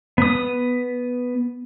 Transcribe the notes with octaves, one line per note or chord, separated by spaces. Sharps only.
B3 D#6